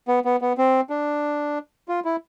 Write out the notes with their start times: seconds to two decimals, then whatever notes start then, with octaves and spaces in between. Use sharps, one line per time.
0.08 B3
0.25 B3
0.41 B3
0.58 C4
0.90 D4
1.88 F4
2.05 E4